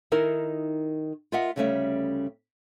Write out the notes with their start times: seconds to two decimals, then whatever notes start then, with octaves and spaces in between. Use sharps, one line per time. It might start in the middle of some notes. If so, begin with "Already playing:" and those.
0.12 D#3 D#4 E4 A#4
1.32 F4 A#4 D#5 E5 F#5
1.56 D2 C#3 G3 A3 C#4 E5